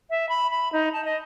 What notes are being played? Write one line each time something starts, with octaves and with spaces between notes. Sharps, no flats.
E5
B5
B5
D#4
A5
D#5